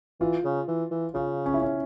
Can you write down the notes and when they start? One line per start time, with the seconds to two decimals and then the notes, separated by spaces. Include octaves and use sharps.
0.20 E3 F4
0.45 C#3
0.68 E3
0.91 E3
1.14 C#3 F4
1.46 C#4
1.54 E4
1.62 C#4